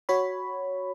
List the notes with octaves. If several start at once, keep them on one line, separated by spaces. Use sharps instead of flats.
F#4 C#5 B5